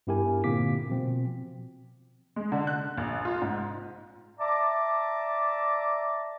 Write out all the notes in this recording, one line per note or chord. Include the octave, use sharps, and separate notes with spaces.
G2 B3 E4 G4 A#4 G#5
A#2 D3 A#3 C4 D6 B6
B2 F3 C4
G#3
D3
F#6
A#1
F4
G#2
D5 E5 A5 A#5 D6